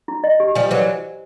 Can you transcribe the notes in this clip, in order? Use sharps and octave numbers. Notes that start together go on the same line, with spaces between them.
E4
D#5
G4
F3 G3 G#5
E3 F#3 C5